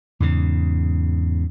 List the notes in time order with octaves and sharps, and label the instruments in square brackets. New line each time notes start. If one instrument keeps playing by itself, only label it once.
[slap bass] E2 G#2 C#3